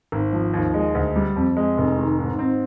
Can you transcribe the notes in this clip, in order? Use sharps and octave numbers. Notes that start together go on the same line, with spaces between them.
G#1
F3
D#2
G#3
D2
G3
F2
G#3
F1
D#3
G#2
C4